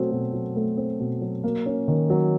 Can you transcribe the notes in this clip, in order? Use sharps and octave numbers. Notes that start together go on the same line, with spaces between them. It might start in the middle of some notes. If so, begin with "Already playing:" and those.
Already playing: B2 F#3 A3 C4
B2
F#3
A3
C4
B2
F#3
A#3
C#4
D#3
F#3